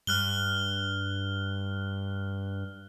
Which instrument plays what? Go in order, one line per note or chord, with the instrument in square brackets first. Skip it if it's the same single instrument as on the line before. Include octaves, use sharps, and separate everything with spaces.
[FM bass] G2 [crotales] F6 F#6 G7